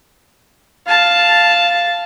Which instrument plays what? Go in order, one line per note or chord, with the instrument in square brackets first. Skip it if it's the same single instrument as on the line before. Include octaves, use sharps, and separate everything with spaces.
[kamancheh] F5 A5